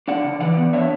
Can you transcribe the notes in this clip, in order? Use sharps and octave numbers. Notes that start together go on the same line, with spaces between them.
D4 D5 F#5
C#3
E3 D5 F#5
B3
D4 C#5 E5